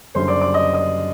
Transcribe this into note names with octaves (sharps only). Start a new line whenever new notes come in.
F#1 F#2 D3 G3 D4 C5 C6
D5 D6
D5 D6
D#5 D#6
D#5 D#6